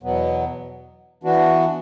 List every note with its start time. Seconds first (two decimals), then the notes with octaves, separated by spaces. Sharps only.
0.03 E2 B2 F#3 B3
1.23 E3 B3 D4 F#4